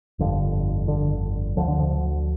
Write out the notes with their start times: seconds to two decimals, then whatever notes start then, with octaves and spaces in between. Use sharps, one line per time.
0.19 G1 F2 D3
0.88 D3
1.57 D2 D3 F3
1.68 D3
1.79 F3